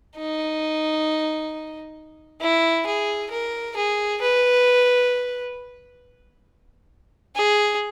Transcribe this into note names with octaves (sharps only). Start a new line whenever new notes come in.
D#4
E4
G#4
A#4
G#4
B4
G#4